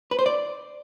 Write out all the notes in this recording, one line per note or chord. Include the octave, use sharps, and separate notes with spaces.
B4
C5
D5